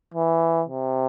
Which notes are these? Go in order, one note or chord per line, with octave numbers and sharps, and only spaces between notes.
E3
C3